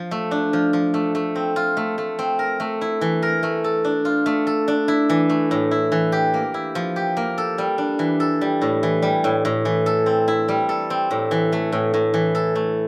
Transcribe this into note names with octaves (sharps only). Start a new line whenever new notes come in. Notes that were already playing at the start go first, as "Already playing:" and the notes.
Already playing: F3
A3
D4
F3
F3
A3
A3
C4
F4
A3
A3
C4
A#4
A3
E4
E3
A#4
A3
A4
D4
F4
A3
A4
D4
E4
E3
A3
A2
E4
E3
G4
A#3
E4
F3
G4
A#3
A4
G3
D4
E3
A4
G3
A2
E3
G3
A2
A2
E3
A4
C4
E4
G3
A4
C4
A2
E3
A3
A2
A2
E3
A4
A3